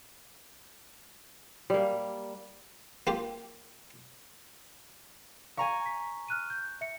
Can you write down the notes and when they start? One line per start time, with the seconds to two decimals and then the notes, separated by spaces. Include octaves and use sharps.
1.70 G3 A#3
3.07 A#3 F4 G4
5.57 F5 G#5 A#5 C#6
5.86 B6
6.28 F6 F#6 D#7
6.50 G6
6.81 E5 C#7